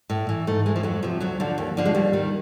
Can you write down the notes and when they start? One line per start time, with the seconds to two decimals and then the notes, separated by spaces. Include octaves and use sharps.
0.10 A2
0.29 E3
0.47 G#2 A3
0.66 E3 G#3
0.76 F3
0.83 F2 F#3
1.03 C3 F3
1.20 D2 F#3
1.40 D3 F3
1.58 D#2
1.77 D3 F3
1.85 G#3
1.95 D#2 G3
2.13 D#3